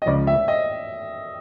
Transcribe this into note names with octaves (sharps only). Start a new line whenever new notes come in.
D#5
C#2 C#3 F3 D5
E5
D#5